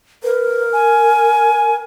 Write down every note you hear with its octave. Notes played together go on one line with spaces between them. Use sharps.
A#4 B4
G#5